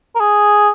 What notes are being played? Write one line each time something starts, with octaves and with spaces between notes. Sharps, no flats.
A#4
G#4